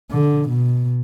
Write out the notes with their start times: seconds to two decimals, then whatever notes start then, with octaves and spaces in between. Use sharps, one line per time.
0.11 D3
0.49 B2